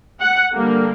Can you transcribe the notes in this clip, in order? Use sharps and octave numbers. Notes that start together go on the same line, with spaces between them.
F#5
D3 G3 A#3